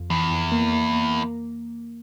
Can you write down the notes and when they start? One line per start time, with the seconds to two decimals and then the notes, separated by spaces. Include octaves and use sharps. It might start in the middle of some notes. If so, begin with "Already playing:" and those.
Already playing: F2
0.10 E2 E3
0.31 F2
0.52 A#3
0.73 A#3
0.93 A#3
1.14 A#3